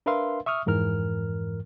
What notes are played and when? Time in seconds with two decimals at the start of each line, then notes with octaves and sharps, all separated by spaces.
0.06 D4 A#4 B4 E5 F5 C6
0.46 E5 C#6 D#6 F6
0.66 F2 G#2 E3 A#4 F6